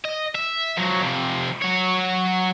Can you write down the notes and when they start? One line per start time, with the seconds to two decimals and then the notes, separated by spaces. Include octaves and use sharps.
0.05 D#5
0.35 E5
0.77 F2 F#3
1.01 F2 C3
1.62 F#3 C#5